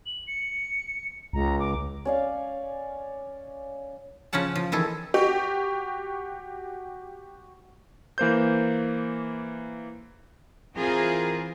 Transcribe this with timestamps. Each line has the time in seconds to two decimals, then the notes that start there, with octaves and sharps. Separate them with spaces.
0.06 F#7
0.27 C#7
1.33 C#2 A#5
1.60 D6
2.05 C#4 D5 F5
4.33 C#3 F3 C#4 F#5 A5
4.56 F3
4.72 D#3 E3 G#4 A4
5.14 F#4 G4
8.18 E3 A#3 C5 G6
10.75 E3 C4 F4 G#4 A#4